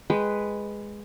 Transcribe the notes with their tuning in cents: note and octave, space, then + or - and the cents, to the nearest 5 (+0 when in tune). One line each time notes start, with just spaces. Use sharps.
G#3 -5 B4 +0 G5 +0